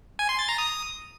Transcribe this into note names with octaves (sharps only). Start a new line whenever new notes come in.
G#5
C6
A6
A#5
D#6